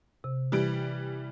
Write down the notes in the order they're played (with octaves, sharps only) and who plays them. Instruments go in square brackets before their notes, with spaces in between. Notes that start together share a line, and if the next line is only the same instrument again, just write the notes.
[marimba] C3
[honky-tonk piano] E3 G3 D7 [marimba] G4